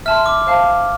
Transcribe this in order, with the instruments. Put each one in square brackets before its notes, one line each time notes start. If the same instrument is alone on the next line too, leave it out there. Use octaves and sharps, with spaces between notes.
[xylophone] E5 A5 C6 [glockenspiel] F6
[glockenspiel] D6
[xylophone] C5 F5 A5